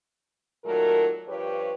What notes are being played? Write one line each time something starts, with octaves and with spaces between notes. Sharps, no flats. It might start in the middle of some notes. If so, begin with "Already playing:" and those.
A#2 D#3 F#3 A3 A#4
G2 F3 G4 B4 C#5